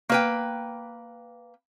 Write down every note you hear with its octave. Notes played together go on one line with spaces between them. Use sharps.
A#3 B4 G5